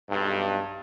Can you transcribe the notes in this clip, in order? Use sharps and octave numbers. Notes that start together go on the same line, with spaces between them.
B1 G2